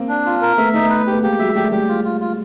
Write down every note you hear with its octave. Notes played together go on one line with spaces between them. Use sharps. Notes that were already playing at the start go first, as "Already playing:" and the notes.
Already playing: A#3 C4
D4
F4
A#4
A3 B3 E5
A3 B3 D#4
B4
A3 B3 G4
G#3 A#3 G4
F#3 G#3 E5
G3 A3 G4
G3 A3 G4
F4
F4
F4